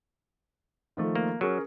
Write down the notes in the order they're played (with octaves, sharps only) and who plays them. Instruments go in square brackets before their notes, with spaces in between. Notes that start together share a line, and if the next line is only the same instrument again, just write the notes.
[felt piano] D#3 F3 A3
[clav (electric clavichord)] A#3
[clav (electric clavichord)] F#3 [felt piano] C#4 G#4 A#4